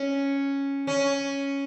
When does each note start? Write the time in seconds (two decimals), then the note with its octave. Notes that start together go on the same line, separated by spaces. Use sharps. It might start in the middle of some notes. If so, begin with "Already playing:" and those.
Already playing: C#4
0.87 C#4